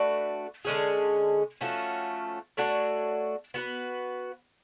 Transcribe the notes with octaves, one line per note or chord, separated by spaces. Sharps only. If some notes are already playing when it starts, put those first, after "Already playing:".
Already playing: A3 D4 F#4 B4
D3 G#3 C#4 G#4
F3 A3 C#4 F#4
A3 D4 F#4 C#5
B3 F#4 B4